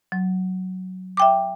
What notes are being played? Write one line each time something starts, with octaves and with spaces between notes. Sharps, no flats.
F#3
E5 G5 D6